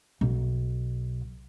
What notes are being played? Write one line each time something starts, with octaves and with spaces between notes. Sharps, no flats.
B1